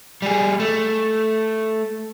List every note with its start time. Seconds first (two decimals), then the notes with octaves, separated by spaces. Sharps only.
0.22 G3 G#4
0.60 A3